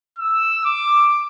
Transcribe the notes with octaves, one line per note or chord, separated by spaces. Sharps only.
E6
D6